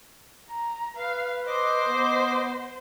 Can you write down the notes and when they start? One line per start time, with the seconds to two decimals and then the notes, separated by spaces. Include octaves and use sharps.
0.48 A#5
0.96 B4 F5
1.47 C5 D#5 D6
1.88 B3